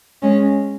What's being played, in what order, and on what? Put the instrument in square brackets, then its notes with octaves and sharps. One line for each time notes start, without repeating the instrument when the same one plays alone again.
[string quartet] G#3 C#4